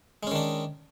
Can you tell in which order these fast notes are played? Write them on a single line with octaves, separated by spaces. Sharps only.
G#3 C#4 D#3 D4